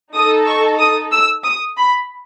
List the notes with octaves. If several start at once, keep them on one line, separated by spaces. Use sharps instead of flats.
D#4 A4 D#6
C#6
D#6
E6
D#6
B5